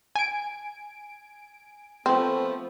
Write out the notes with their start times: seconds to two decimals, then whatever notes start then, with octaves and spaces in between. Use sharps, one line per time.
0.15 G#5 D7
2.06 F3 A3 B3 C4